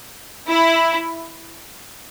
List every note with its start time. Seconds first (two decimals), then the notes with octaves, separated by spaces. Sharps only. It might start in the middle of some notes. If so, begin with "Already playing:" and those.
0.49 E4